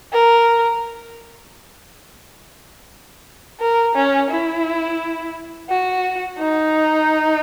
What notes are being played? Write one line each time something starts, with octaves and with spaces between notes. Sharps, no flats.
A#4
A#4
C#4
E4
F#4
D#4